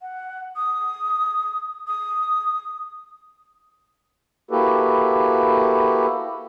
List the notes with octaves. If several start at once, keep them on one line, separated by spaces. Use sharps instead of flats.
F#5
D#6
D#6
A#3 E4 F#4 G4 A4 B4